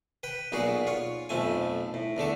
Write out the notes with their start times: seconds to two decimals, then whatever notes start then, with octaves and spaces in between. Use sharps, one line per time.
0.23 B4 G5
0.52 B1 A#2 B3 F#4 G#4
0.87 F4 C#5
1.29 B1 F2 F3 A3 G#5
1.94 A2
2.17 E2 D3 A3 A4